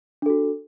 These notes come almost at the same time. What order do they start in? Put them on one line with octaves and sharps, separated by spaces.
D4 A4 F#4